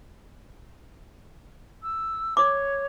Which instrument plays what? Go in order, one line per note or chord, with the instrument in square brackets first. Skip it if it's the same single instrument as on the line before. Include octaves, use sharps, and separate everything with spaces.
[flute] E6
[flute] C#5 [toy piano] D6